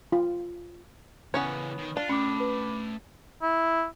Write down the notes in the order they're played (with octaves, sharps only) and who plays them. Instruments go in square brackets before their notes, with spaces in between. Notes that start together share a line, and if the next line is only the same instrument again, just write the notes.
[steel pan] F4
[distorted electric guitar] C#3 E3 [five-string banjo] B3 C#4 C#5
[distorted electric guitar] D#3
[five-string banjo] D4 [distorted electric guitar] F4
[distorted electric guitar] A3 G5 [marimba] C#4 [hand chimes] B5 D6
[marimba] B4
[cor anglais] E4